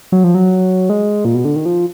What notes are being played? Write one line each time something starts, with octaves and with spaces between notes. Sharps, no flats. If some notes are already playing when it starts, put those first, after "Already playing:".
F#3
F3
F#3
G#3
A#2
B2
D3
D#3
F3